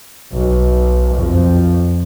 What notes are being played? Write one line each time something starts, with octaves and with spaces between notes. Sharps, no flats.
B1
F2